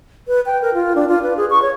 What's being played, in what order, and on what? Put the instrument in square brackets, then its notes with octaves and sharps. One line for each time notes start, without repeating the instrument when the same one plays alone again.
[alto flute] B4
G5
A#4
F4
D4
F4
B4
G#4
C#6
C#5